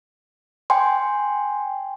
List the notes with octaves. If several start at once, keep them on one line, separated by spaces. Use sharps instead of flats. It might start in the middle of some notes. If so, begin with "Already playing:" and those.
G5 G#5 C6